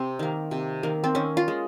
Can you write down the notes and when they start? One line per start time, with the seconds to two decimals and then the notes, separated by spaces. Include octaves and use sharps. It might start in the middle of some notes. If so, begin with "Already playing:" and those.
Already playing: C3 C4
0.19 D#3 A#3
0.51 C3
0.83 D#3 A#3
1.04 C4
1.15 D#3 C#4
1.37 F4
1.48 G#3